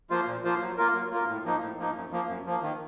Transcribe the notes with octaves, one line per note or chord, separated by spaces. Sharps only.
F3 A#3 F4 C5
A#2
F3 A#3 F4 C5
F#3
A#3 F4 A#4
F#3
A#3 F4 A#4
A2
F3 A#3 D#4
A2
F3 A#3 D#4
F#2
F3 A#3
F#2
F3 A#3
D#3